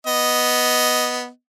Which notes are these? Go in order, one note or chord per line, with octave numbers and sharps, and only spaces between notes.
B3 D#5